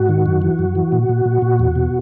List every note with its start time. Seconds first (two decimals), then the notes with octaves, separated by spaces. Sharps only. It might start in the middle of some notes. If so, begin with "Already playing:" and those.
Already playing: G#2 F#4
0.09 D#3
0.26 F#2
0.42 E3
0.59 F#2
0.75 E3
0.92 A#2
1.09 A#2
1.25 A#2
1.42 A#2
1.59 E2
1.75 B2